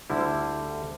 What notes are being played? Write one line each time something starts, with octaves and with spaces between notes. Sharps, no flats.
D2 D3 G3 E4